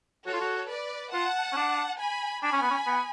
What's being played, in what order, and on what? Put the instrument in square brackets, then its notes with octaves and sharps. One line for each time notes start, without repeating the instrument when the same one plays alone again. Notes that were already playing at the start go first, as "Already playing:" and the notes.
[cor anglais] F#4 [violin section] A4 C#5
[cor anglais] F4
F#4
[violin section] B4 D5
[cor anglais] F4 [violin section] F#5 A5
[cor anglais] C#4
D4
[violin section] G#5 B5
[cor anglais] D4 [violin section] G#5 B5
[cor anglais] C#4
B3
C#4
B3